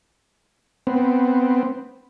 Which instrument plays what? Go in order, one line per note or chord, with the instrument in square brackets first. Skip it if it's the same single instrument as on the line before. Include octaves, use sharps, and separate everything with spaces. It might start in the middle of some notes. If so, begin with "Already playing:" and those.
[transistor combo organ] B3 C4